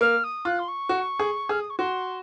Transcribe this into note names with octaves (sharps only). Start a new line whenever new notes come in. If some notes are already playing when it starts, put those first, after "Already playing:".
A#3 F6
D#6
F4 F#6
C6
C#6
F#4
G#4
G#4 F6
D#6
C#6
F#4 C6